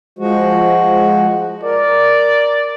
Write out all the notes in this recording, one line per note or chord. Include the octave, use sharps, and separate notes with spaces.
F3 G#3 F#4
A#4 D5